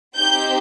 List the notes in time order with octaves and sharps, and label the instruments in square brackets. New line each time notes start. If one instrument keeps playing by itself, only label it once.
[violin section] C4 D#4 G4 G6